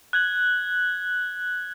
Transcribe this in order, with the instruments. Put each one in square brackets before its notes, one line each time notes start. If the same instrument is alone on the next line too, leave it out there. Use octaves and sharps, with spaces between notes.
[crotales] F#6 G#6 F#7